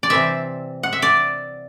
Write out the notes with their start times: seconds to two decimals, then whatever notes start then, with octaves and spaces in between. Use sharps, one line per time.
0.03 D5
0.10 C3 E3 G3 C4 E5
0.83 F#5
0.93 E5
1.02 D5